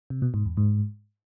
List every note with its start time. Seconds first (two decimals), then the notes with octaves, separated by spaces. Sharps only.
0.10 C3
0.22 B2
0.34 G#2
0.46 E2
0.57 G#2